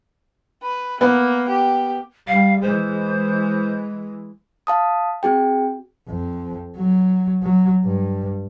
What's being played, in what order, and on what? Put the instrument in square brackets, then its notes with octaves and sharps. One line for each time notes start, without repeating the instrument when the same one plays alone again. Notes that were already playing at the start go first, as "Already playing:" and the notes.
[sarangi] B4
[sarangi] A#3 [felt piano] B3
[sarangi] G4
[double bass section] G3 [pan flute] F5
[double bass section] E3 G#3 [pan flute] C5
[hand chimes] F5 A5 D#6
C4 F#4 G#4 G5
[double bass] F2
F#3
F#3
G2